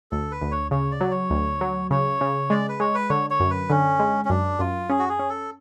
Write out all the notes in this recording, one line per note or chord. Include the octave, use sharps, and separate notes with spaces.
D2 A4
B4
D2
C#5
C#3 C#5
D5
F#3
C#5
D2
F#3
C#3 C#5
C#3
G#3 D5
B4
G#3 C#5
B4
D3 C#5
C#5
F#2
B4
D3 C#4
G#3
C#4
F#2 D4
F#2 F4
C#4 G#4
F#4
G#4
C#4
A4